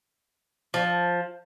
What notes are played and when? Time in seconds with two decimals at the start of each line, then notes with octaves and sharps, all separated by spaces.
0.74 F3